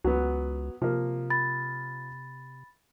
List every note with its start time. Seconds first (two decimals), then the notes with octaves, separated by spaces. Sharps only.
0.04 C#2 F#3 B3
0.82 C3 F3 A#3
1.30 B5 A6